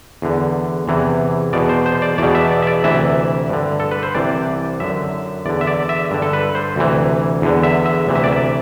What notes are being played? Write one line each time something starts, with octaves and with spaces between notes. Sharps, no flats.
E2 D3
E2 C3 E3
E2 B2 D5
C5
C5
D5
E2 B2 D5
E5
D5
E5
D5
D2 C3 E3 E5
G2 D3
A4
B4
C5
C2 C3 E3 D5
F#2 D3 E5
E2 D3 D5
E5
D5
E5
G2 D3
A4
B4
C5
D2 C3 E3
E2 D3
E5
E5
D2 C3 E3
E5
D5
E5